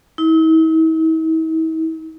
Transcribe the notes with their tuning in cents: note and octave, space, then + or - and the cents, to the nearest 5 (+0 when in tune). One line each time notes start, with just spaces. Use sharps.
E4 -45